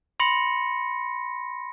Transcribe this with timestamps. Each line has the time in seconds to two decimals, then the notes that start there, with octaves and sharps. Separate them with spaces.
0.20 B5 C6 A#6 C#7